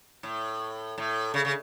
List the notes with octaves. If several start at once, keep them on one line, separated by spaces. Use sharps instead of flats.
A2
A2
C#3
C#3